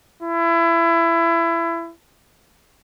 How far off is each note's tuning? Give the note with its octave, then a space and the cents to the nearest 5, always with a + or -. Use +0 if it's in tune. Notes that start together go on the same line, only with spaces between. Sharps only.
E4 +25